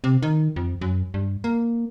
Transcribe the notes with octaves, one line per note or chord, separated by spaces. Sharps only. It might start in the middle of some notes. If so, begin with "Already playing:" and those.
C3
D#3
F2
F#2
G2
A#3